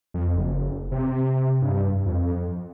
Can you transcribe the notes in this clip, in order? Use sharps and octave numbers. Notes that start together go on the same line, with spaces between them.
F2
F#1
C3
G2
F2